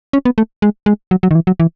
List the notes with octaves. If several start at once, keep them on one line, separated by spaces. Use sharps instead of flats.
C#4
B3
A3
G#3
G#3
F#3
F#3
D#3
E3
F#3
E3